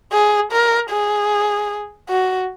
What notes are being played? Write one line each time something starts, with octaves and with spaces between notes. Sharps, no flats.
G#4
A#4
G#4
F#4